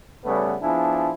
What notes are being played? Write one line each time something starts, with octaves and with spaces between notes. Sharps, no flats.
C#3 G3 A3 B3
F3 B3 D4 E4 G#4